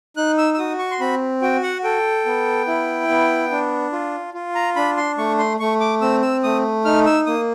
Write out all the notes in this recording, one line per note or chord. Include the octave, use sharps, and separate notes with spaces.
D#4 F#6
E6
E6
F#4 D#6
C#6
C6
C4 B5
F#4 G5
F#5
A4 G5
B3
E4
B3
D4
F4
F4
A#5
D4 B5
C6
A3 C#6
C6
A3 C#6
D6
C4 E6
E6
A3 D#6
D#4 F6
E6
A#3 D#6